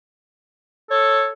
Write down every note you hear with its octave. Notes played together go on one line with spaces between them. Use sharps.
A4 C#5